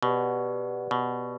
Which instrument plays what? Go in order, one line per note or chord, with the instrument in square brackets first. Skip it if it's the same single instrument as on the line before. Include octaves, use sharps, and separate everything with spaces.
[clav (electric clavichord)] B2 [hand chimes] G4 B4 D5 F#5
[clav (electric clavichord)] B2